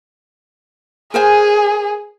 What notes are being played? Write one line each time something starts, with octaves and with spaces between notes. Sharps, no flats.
G#4 A#4 C5 G#5